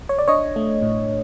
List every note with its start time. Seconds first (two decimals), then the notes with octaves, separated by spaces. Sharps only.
0.09 C#5
0.19 D5
0.28 D4 C#5 D#5
0.56 A3
0.82 A2